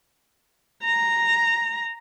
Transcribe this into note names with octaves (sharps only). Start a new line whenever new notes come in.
A#5